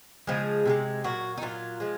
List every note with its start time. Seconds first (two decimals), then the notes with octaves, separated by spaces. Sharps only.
0.27 C#3 F3 G#3 G#4
0.65 C3 F3 G#3
1.04 A#2 F#3 F#4
1.38 D#4
1.42 A#2 F#3 F4
1.80 F3 G#3